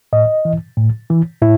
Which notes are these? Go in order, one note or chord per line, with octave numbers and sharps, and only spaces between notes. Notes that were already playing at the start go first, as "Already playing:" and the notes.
A2 D#5
E3
A2
E3
A2 E4